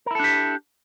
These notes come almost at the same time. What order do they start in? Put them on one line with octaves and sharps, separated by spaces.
A#4 E4 A4 D4 G4